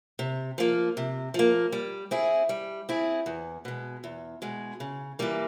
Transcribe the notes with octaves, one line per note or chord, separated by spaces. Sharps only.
C3
F3 A#3
C3
F3 A#3
G3
C4 E4 G#4
G3
C4 E4 G#4
E2
B2 G#3
E2
B2 G#3
C#3
E3 G3 A#3